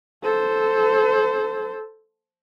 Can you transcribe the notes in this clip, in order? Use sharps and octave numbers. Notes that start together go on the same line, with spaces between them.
A4 C5